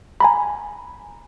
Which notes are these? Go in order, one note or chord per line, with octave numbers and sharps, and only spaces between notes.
G#5 A#5 B5